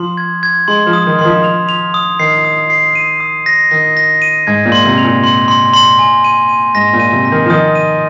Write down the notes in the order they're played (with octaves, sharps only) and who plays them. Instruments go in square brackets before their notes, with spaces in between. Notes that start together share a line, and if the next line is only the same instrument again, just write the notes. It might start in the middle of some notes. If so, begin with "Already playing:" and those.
Already playing: [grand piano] F3 [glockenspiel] C6
[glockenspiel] G#6
G#6
[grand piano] G#3 [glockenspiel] C6
[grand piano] F3
[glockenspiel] D#6
[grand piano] D#3
[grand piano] D#3 [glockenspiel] C6
[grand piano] F3
[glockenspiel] F7
F7
D#6
[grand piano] D#3 [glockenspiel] C7
[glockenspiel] D#6
C7
D#7
D#6
A#6
[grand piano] D#3 [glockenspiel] A#6
[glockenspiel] A#6
D#7
[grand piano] G#2 [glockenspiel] G#6
[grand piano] A#2
[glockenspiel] C6
[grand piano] C3
[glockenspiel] F7
[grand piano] A#2
[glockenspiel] C6
C6
C6
G#5
D#7
D#7
[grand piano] G#2 [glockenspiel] A#6
[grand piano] A#2
[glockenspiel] D#7
[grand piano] C3
[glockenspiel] A#6
[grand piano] D#3
F3
[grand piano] D#3 [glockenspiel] D#6
[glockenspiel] D#7